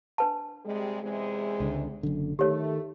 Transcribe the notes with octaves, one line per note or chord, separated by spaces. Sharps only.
D4 B4 A5
C3 G3 G#3
E2 C3 G#3
C#2 D3
F#1 F#2 D3
D#3 A3 G4 C#5